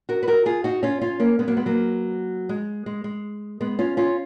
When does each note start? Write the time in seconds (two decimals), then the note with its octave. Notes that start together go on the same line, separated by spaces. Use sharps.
0.09 F#4 A#4
0.23 B4
0.28 F#4 A#4
0.46 F4 G#4
0.64 D#4 F#4
0.83 C#4 F4
1.01 C#4 F4
1.20 A#3 C#4
1.39 G#3 B3
1.48 F#3 A#3
1.57 G#3 B3
1.66 F#3 A#3
2.49 G#3
2.86 G#3
3.04 G#3
3.61 G#3 B3
3.79 C#4 F4
3.97 C#4 F4